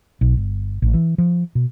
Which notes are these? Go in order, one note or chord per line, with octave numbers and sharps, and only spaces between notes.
B1
G1
A1
E3
F3
B2